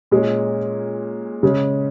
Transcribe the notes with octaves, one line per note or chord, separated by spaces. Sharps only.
A#2 G#3 C#4
C#3 G#3 C#4